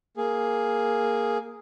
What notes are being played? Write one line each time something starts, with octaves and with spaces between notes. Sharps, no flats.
A#3 G#4